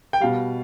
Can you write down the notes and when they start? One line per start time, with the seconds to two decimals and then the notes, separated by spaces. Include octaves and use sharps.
0.13 G5
0.20 B2 G3 F5